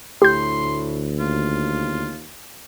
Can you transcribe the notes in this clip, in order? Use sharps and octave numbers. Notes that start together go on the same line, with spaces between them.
D2 A2 G4 C6 G6
D#2 F4